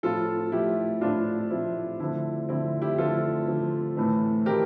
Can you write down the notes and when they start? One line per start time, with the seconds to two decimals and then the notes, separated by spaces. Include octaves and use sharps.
0.03 A2 F3 A3 C4 F4 A4
0.52 A2 F3 A3 C4 E4 G4
1.01 A2 F3 A3 C4 D4 F4
1.50 A2 F3 A3 C4 E4
2.00 D3 F3 A3 C4 E4
2.49 D3 F3 A3 C4 E4
2.82 E4 G4
2.98 D3 F3 A3 C4 F4 A4
3.47 D3 F3 A3 C4
3.97 A2 E3 A3 C4
4.46 E3 A3 C4 G4 A#4